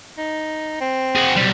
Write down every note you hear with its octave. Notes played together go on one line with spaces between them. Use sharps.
D#4
C4
F#4 G#4
B1 G3